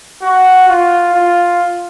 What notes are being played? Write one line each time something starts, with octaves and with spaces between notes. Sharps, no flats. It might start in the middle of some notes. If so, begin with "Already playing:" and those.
F#4
F4
F4